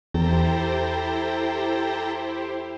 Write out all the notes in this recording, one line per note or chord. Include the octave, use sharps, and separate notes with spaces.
E2 E4 G4 A4 C5 G5 A#5